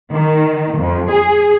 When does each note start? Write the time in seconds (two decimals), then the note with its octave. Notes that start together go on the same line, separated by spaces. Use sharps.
0.13 D#3
0.79 F2
1.10 G#4